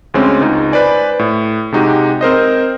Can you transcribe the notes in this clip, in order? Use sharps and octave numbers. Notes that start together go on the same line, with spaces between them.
D2 G#3 C4 C#4
C#2 D#4
B4 C5 D5 G#5
A2
C3 G#3 D#4 F#4 G4
C4 A#4 C5 D#5